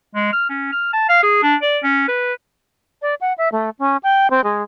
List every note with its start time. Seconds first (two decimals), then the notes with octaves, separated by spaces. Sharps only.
0.15 G#3
0.33 F6
0.50 C#4
0.73 F6
0.93 A5
1.09 F5
1.23 G#4
1.43 D4
1.62 D5
1.83 C#4
2.08 B4
3.02 D5
3.21 F#5
3.38 E5
3.52 A3
3.79 C#4
4.03 G5
4.30 C4
4.44 G#3